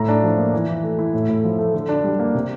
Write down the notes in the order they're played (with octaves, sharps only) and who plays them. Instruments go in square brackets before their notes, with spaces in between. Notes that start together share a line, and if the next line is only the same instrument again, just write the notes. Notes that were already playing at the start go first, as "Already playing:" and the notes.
Already playing: [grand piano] A2 A#5
D4
F3
A#3
E3
E3
A3
E4
A2
A2
F3
A3
D3
D4
G3
A#3
C3